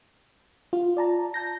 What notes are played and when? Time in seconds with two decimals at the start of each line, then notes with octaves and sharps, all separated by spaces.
0.73 F4
0.97 D5 A5 A#5
1.34 A5 G6 A#6